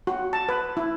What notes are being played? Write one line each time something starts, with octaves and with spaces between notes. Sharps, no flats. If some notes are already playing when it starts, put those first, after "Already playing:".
F#4
A5
B4
E4